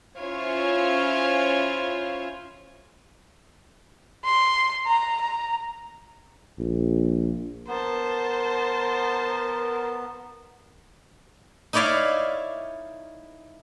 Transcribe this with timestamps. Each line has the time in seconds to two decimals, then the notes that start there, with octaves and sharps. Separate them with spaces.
0.17 C#4 E4 F4 C5 C#5
4.25 C6
4.86 A#5
5.21 A#5
6.59 A#1
7.68 B3 A#4 C5 A5
11.73 D#4 E4 C#5 D5 E5 F5